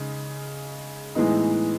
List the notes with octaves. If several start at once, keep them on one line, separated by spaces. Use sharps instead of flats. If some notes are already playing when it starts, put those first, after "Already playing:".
Already playing: C#3 G#3 D#4
A2 E3 G#3 B3 D#4